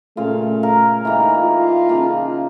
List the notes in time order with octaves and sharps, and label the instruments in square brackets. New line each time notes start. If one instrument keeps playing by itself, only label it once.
[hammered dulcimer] A#2 C#3 F5 [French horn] A3
[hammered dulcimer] G#4 A#4 F5
E3 A#3 D#4
[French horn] F4
[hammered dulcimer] C#3 F3 A#3